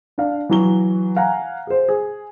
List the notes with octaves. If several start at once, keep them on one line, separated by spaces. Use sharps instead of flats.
D4 F5
E3 F#3 G7
F5 F#5 G#5 A#5
G#4 C5
G#4